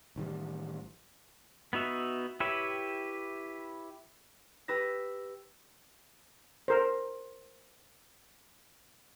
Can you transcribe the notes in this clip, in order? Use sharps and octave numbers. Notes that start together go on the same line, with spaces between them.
A1 D#3 F#3 G3
B3 D#4 F#4 E5
E4 G4 B4 C#5 E5
G4 B4 E6 A#6
A#4 C5